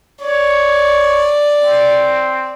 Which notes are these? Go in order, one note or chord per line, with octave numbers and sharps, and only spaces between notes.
C#5 D5
C4